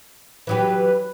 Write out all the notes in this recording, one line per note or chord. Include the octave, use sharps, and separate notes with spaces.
E3 F#3 G4 B4